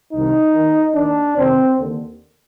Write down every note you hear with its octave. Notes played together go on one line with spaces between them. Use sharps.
C2 C3 D#3 D#4
D#2 D#3
D#2 D#3 D4
F2 C3 D#3 C4
D#2 D3